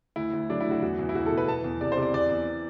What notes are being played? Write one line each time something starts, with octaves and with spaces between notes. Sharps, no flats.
D2 E4
D2
F#3 D4
E4
D2
F#4
E2 F#4
E2
E4
E2 F#4
A4
B2
B4
E2 A5
E2
C3 D5
C5
C3
D5
E2 D5
E2